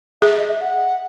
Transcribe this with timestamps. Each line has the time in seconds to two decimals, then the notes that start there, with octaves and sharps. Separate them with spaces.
0.21 G#4 E5
0.37 D#5
0.49 E5
0.61 F#5